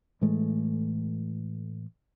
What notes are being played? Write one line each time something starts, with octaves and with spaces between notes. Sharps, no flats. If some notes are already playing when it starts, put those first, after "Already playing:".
A2 E3 G#3 A3